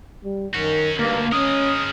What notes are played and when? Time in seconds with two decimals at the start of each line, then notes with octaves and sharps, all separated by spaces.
0.24 G3
0.54 D#3 C#4 F#4
0.99 D2 G2 A#3
1.32 G#3 C#4 A#4 D#6